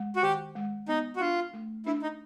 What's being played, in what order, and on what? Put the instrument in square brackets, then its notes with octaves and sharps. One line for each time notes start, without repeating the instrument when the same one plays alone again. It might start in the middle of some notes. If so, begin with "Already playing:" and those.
Already playing: [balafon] G#3
[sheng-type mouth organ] F#4
[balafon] D#3 [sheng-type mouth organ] G4
[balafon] G#3
[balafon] B3 [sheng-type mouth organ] D#4
[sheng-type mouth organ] F#4
[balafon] D4 [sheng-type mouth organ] F4
[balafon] A3
[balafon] D4 [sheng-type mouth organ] E4
[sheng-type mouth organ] D#4